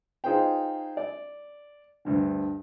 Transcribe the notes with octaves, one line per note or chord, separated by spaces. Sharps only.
D#4 F4 G#4 B4 C5 G5
D5
D2 G2 D3